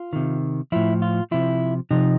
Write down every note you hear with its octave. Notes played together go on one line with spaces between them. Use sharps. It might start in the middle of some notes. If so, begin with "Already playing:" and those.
Already playing: F4
C3 D#3
A2 F3 E4
F4
C3 F3 E4
C3 F3 D#4